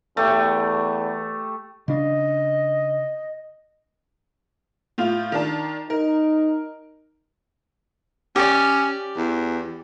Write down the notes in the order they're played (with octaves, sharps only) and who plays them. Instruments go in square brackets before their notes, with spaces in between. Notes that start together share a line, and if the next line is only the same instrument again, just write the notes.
[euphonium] E2 [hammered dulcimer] A3 G4
[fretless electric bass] C#3 D4 [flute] D#5
[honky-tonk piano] A2 F4 F7
D#3 D4 A5
[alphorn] D#4 [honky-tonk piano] A#4
[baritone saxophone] C#4 [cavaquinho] G4 D5
[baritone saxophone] E2